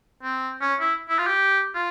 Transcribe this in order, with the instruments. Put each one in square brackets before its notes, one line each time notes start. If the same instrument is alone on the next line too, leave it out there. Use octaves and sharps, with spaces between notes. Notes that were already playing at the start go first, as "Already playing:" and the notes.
[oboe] C4
C#4
E4
E4
F4
G4
F4